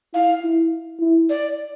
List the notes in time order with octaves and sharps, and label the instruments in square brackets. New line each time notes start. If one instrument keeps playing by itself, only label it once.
[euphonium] E4 [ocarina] F5
[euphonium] E4
E4
[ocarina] D5